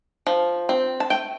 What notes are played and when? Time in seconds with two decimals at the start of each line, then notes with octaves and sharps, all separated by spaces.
0.27 F3
0.69 C4
1.00 A5
1.10 A3 G5